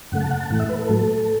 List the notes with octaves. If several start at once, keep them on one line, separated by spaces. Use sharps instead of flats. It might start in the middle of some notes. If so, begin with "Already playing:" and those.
F#2 C#3 A3 F#5
A5
F#5
A5
A2 E3 A3 F#5
E5
B4
A4
A2 F#3 A3